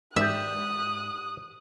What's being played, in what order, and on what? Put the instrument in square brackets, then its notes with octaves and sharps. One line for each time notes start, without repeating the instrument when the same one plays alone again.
[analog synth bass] G#2 [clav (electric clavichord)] G4 D5 [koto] E5 [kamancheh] D#6 F#6